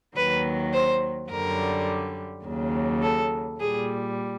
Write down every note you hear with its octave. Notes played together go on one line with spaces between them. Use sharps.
D#2 D#3 F#3 B4
C5
F#2 D3 G3 A#4
D#2 C#3 F#3
A4
A#2 G3 G#4